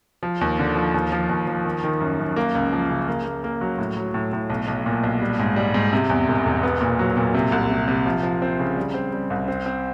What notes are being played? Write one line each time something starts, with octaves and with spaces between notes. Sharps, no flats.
F3
D#2
D3
F3
D#2
F3
D#2
F3
D#3
D#3
F#2
F#2
A#3
C#2
F3
C#3
A#3
A#3
A#3
F#3
A2
F#3
A2
A2
B1
B1
A#2
B1
G3
G#2
G3
G#2
C3
E2
E1
E1
B3
A#2
F#3
A#2
C3
C2
C3
C3
F3
F3
C4
C#3
G3
C4
G3
C2
C4
C4